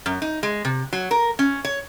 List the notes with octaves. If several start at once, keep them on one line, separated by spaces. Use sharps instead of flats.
F#2
D#4
G#3
C3
F#3
A#4
C#4
C#5